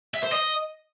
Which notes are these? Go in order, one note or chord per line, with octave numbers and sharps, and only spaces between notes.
E5
C5
D#5